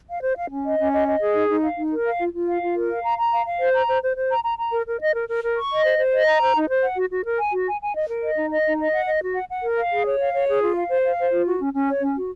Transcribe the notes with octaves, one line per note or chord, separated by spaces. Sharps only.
F5
C5
F5
C#4
D#5
C#4
D#5
D#5
G#4
D#4
D#4
F5
D#4
A#4
F5
F4
F4
F5
F4
A#4
F5
A#5
A#5
F5
F5
C5
A#5
C5
C5
C5
A#5
A#5
A#5
A#4
A#4
D#5
A#4
A#4
A#4
C#6
D#5
C5
C5
D#5
A#5
C5
D#4
C5
F#5
F#4
F#4
A#4
G#5
F#4
G#5
G#5
D#5
A#4
D#5
D#4
D#5
D#4
D#5
F#5
D#5
F#4
F#5
F#5
A#4
F5
G#4
C#5
F5
C#5
G#4
F4
F5
C5
F5
C5
F4
F#4
C#4
C#4
C#5
C#4
F#4